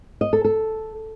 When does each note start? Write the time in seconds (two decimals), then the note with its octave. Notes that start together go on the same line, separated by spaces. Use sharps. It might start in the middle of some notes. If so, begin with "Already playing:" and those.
0.21 D#5
0.33 A4
0.44 A4